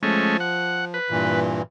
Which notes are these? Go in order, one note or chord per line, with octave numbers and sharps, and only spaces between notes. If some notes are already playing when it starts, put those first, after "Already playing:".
F3 G#3 A3 C#4
F#5
B4
G2 A#2 E3